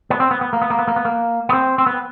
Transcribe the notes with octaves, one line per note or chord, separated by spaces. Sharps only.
B3
C4
B3
B3
A#3
B3
A#3
B3
A#3
B3
A#3
B3
C4
C4
B3